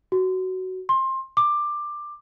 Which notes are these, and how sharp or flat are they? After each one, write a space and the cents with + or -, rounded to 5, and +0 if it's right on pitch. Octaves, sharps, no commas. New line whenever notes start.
F#4 +15
C6 +20
D6 +15